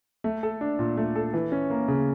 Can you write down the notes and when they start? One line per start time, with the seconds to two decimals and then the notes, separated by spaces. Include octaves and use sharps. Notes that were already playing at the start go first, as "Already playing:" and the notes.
0.24 A3
0.43 A4
0.61 D4
0.79 A#2
0.97 A3
1.16 A4
1.34 E3
1.52 C#4
1.70 A#3
1.88 C#3